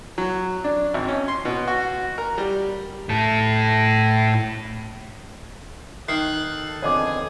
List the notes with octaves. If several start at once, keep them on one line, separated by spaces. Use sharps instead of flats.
F#3
D4
G#1
C#4
C6
B2
F#4
A#4
G3
A2 A4
D#3 F#6 C7
A4
F2 D3 B3 G#4 C#5 D#5 D6